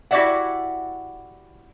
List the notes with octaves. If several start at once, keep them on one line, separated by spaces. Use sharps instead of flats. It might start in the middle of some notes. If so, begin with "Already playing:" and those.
E4 F#4 G4 D5 E5 F#5